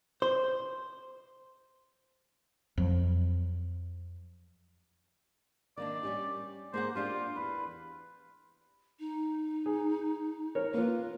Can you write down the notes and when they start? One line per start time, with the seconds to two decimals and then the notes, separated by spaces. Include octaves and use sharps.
0.22 C5
2.77 F2 F#3
5.78 D#3 A#3 D4 D5
6.03 G3 C#4 G4
6.74 A#3 G#4 C5 F#5
6.96 A#3 D4 F4 G4
7.36 E2 B4
8.99 D#4
9.66 G#4
10.55 A#4 C#5
10.74 A#3 F4 B4